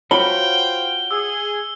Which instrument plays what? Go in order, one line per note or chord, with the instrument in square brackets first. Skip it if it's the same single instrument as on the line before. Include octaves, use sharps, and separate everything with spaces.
[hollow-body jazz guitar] F4 F#4 C#5 [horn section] C5 F5 G5 [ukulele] B5 [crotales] G7
[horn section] G#4 [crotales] E6